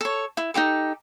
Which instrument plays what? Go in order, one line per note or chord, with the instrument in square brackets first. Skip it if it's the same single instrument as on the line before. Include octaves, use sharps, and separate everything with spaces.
[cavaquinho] A4 C#5
E4
D#4 F4 G4 A4